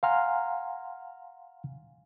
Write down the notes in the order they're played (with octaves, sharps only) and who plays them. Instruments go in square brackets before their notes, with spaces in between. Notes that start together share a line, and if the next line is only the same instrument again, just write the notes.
[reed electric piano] F5 F#5 G#5 A#5 C6 F6